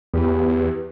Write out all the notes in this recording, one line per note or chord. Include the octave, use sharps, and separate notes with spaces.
E2 B3 G4 B4